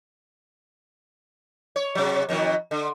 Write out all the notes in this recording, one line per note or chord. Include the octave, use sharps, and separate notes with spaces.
C#5
C3 F#3
F2 B2 D#3
D3